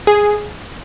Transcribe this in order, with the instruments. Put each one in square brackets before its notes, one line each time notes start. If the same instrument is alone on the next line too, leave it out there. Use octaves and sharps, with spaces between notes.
[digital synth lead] G#4